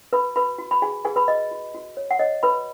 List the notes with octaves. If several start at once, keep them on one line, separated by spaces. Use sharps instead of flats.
F#4 B4 B5
F#4 B4 B5
F#4
B5
F#4 G#4 G#5
G#4 B4 G#5
B4 B5
F#4 D#5
F#4
F#4
C#5
F#5
C#5 D#5
F#4 B4 B5